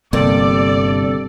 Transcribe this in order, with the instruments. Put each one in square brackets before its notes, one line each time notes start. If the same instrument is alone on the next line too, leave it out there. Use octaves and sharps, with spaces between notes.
[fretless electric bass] G1 C3 A#3 [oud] G2 [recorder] A4 [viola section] D5